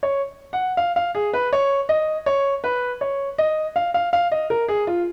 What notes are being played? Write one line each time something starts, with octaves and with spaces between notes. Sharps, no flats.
C#5
F#5
F5
F5
G#4
B4
C#5
D#5
C#5
B4
C#5
D#5
F5
F5
F5
D#5
A#4
G#4
F4